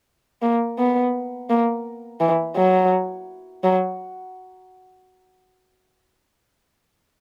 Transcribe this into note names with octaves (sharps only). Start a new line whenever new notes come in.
A#3
B3
A#3
E3
F#3
F#3